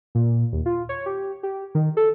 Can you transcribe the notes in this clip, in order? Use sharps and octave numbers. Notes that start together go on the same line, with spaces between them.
A#2
D#2
F4
C#5
G4
G4
D#3
A4